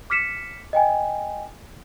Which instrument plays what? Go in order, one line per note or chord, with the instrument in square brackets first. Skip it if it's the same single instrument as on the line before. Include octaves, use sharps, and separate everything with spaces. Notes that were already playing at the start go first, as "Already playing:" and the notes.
[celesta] D6 F6 B6 C#7 E7
D#5 G5 G#5